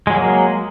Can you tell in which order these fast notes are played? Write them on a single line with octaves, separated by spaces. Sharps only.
G#3 F#3 A#3